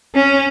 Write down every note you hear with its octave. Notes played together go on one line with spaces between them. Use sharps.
C#4